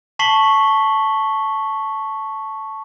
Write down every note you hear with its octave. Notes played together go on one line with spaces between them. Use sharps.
A5 C#6 B6 C7 F#7 G7